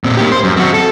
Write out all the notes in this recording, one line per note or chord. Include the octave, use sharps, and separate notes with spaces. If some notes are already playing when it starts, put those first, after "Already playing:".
A#2 C4
A#3 G4
C5
F#2
C4 F#4
A4